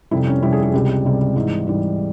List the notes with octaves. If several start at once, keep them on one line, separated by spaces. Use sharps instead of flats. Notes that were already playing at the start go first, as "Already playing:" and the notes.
F2 C3 G3 E4
C#4
F2 C3 G3 E4
G#4
G#4
C#2 C3 G3 G4
C#2 C3 G3
G#2 E3 G3
G#2 E3 G3